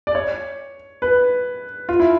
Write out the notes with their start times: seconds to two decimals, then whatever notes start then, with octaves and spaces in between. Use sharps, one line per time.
0.07 D5
0.15 C#5
1.02 B4
1.89 F4
2.00 E4